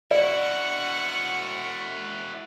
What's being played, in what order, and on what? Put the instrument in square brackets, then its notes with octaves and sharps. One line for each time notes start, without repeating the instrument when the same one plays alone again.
[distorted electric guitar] E4 F#4 [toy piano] D5 [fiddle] F#5 C#6